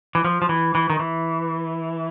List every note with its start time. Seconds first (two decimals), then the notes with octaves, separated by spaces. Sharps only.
0.15 E3
0.25 F3
0.42 F3
0.49 E3
0.75 E3
0.90 D#3
0.99 E3